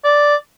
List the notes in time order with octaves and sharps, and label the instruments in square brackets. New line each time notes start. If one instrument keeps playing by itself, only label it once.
[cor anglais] D5